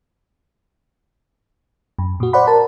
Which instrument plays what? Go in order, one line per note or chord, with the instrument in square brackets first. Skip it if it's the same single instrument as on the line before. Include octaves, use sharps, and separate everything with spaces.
[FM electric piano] F#2
A#2 F#4
C5 D5 F#5 B5
A#4 A5